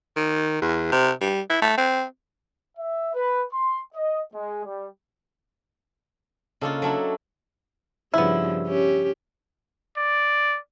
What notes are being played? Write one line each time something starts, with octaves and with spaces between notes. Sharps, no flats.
D#3
E2
C3
G3
E4
A3
C4
E5
B4
C6
D#5
G#3
G3
C#3 A#3 D4 F4 A4 D#5
F#3 D4 E4 A4 C#5 A5
G2 C#3 F3 B3 E4
C#4 G4
D5